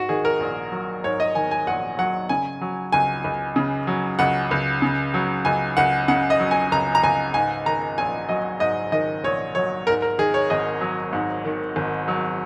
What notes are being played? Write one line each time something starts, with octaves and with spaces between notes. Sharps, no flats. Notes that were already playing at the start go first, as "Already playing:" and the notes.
Already playing: G#2 F#4
D#3 G#4
A#4
A#1
F#3
G#2 C#5
D#5
D#3 G#5
G#5
A#1 F#5
F#3 F#5
C#3 G#5
F#3
C#2 G#5
C#2
C#3
F#3
C#2 F#5
C#2
C#3
F#3
C#2 G#5
C#2 F#5
C#3 F#5
D#5
F#3
G#5
C#2 A#5
A#5
C#2 G#5
G#2 G#5
D#3 A#5
A#1 G#5
F#3 D#5
G#2 D#5
D#3 D#5
A#1 C#5
F#3 C#5
G#2 A#4
A#4
D#3 G#4
C#5
G#1 D#5
F#3
G#2
D#3
G#1
F#3